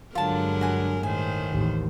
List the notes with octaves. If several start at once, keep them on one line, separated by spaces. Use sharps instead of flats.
G2 D3 F#3 G#3 F4 A#4 A5
F#4 G#5
A2 D#3 C5 G#5
A1 D#2